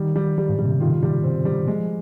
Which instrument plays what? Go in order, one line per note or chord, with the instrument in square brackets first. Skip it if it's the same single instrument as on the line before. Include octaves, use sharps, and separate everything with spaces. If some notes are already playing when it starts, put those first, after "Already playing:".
Already playing: [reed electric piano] D#3 [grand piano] G3
[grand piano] G3
G3
[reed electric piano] G#2
[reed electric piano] A#2 [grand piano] G3
[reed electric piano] C3
C#3
[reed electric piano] D#3 [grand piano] F4
[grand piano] G3
C4
G3
[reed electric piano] F3 [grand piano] G#3